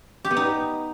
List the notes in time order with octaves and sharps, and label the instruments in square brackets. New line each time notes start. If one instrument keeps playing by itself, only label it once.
[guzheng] G4
B3
D#4